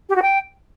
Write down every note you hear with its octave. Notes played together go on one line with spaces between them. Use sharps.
G4
F#4
G5